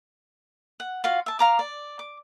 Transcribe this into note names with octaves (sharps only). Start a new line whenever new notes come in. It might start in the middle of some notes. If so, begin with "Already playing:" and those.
F#5
F4 F#4 F5
E5 A5
F5 A#5 D6
D5
D6